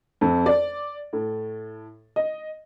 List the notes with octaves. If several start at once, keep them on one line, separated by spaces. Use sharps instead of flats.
F2
D5
A2
D#5